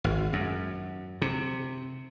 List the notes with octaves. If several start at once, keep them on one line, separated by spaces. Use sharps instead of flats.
G#1
F#2
C3